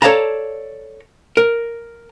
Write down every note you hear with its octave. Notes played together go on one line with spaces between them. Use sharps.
A4 C#5 D5 F5 A5 A#5
A#4